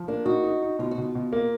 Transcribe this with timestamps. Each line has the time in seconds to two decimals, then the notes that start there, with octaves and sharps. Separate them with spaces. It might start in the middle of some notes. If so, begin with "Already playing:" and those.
Already playing: F3
0.08 A#3 D4
0.25 D#4 F#4
0.44 D#4
0.62 D#4
0.79 B2 F4
0.91 F#4
0.98 B2 F4
1.15 B2
1.33 A#3